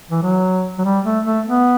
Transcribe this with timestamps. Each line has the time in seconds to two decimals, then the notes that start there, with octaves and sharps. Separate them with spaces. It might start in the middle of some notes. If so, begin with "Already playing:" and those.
0.11 E3
0.23 F#3
0.78 F#3
0.84 G3
1.05 A3
1.25 A3
1.46 B3